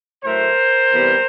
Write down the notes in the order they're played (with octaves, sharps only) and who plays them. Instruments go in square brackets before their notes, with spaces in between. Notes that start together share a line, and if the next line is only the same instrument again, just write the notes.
[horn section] A2 F#3 A3 A#4 C5
C3 E3 G3 B3